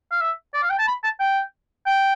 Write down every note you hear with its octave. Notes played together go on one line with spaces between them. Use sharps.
F5
E5
D5
F5
G5
A5
B5
A5
G5
G5